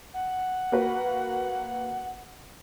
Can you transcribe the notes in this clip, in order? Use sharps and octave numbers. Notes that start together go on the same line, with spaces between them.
F#5
A#3 F#4 B4